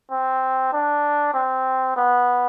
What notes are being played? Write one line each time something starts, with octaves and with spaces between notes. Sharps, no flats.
C4
D4
C4
B3